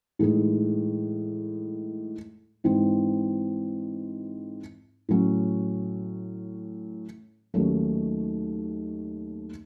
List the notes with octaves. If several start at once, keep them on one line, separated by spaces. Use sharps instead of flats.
A2 E3 G#3 D#4
G#2 E3 C4 D#4
A2 F#3 C#4
D#2 D#3 F#3 A3 C#4